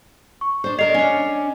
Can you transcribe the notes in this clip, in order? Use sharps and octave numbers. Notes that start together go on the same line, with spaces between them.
C#6
D4 C5
D4 A#4 D5 D#5 C7 F7
C#4 D4